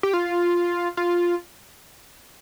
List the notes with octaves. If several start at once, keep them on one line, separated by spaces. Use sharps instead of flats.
G4
F4
F4